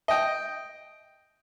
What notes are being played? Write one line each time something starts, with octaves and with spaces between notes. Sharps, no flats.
D#5 G5